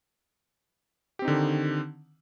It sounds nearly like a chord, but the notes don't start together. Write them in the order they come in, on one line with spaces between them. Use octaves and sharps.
G4 C4 D#4 D3 D#3